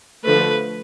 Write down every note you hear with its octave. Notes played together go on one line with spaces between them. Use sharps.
D3 F3 A3 B4